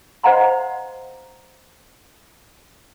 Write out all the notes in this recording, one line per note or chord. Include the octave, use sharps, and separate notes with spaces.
C5 D#5 F5 F#5 A#5 C6